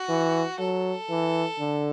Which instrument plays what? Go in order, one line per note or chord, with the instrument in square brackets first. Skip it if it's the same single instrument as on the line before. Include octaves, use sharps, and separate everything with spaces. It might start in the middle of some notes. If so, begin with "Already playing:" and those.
Already playing: [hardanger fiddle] F#4
[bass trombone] E3
[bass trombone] F#3 [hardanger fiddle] A4
[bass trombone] E3
D3